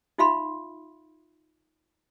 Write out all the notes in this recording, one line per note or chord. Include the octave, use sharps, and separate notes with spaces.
D#4 F4 E5 F5 B5 C6